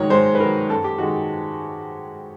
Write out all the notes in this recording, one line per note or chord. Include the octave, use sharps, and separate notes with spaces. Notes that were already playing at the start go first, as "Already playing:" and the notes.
Already playing: G#2 D#3 F#3 C#5
G#2 C5
B4
D#3 F#3 A#4
F#2 A4
G4
D#3 G#3 F#4